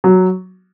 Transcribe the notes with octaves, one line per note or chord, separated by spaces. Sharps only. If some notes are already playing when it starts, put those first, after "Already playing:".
F#3